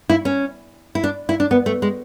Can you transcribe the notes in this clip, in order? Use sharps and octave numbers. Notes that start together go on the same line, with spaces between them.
E4
C#4
E4
D4
E4
D4
B3
A3
G#3